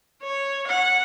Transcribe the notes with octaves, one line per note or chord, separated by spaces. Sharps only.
C#5
F#5